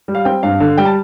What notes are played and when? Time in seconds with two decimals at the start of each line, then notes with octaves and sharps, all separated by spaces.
0.08 G3
0.15 F5
0.25 C4 G5
0.43 G2 F5
0.60 D3
0.78 G3 G5
0.85 A5